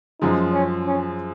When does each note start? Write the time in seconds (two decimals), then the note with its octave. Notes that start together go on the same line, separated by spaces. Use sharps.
0.21 F#2 F3 G#3 D#4
0.53 C#4
0.87 C#4